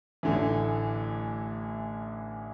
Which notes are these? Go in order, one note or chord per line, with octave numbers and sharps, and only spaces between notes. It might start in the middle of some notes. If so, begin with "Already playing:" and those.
A1 D3 E3